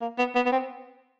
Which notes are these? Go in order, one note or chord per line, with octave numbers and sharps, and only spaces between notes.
A#3
B3
B3
B3
C4